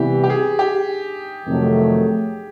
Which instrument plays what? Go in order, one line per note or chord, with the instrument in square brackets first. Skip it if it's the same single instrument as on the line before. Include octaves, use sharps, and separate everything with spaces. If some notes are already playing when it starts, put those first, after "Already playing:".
Already playing: [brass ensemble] C3 E3 G3 B3 E4 [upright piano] G4
[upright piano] G4
G#4
G4
[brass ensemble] F2 C3 D#3 F#3 A3